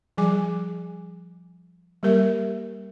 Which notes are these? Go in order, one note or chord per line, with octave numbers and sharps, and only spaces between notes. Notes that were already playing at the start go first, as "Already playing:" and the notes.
F3 G3 G#4 G#5 D6
G3 A#3 G4 A#4 E5